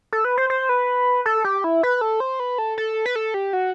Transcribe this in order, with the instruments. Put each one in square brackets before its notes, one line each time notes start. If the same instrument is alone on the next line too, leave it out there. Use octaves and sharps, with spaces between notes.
[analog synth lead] A4
B4
C5
C5
B4
A4
G4
E4
B4
A4
C5
B4
A4
A4
B4
A4
G4
F#4